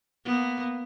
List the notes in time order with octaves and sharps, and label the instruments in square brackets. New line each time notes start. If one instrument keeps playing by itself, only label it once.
[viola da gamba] A#3 B3